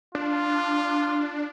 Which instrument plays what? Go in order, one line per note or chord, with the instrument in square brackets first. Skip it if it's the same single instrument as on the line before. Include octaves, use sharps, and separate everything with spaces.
[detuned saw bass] D4 [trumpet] F4